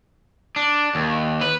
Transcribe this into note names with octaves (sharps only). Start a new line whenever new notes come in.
D4
D#2
B4